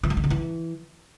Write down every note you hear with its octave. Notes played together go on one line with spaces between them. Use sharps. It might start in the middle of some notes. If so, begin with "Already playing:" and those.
E3
F#3
D#3
C#3
E3